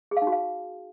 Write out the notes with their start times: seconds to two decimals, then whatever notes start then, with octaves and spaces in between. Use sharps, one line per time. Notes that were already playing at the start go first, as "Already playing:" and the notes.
0.11 G#4
0.17 F5
0.22 D#4
0.27 F#4
0.32 F5